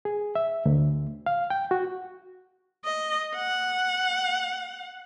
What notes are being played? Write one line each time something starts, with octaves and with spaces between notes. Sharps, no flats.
G#4
E5
D2
F5
G5
F#4
D#5
F#5